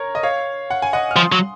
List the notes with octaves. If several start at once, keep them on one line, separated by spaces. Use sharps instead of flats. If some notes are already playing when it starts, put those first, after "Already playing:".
Already playing: A#4 C#5
D#5
C#5 F5
F#5
G#5
D#5 F#5
F6
F3 C6 D#6
F#3